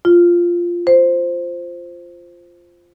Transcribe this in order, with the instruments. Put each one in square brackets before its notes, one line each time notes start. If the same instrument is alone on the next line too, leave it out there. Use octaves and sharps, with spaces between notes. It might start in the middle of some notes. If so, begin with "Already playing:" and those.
[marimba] F4
C5